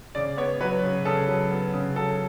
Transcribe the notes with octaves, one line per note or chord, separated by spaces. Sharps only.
C#3 D5
B3 C#5
F#3 B4
C#3
C#3 A4
F#3
B3
C#3
F#3 A4